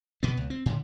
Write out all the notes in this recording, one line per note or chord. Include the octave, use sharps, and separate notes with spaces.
B2 B3
C#2
C4
A2 D3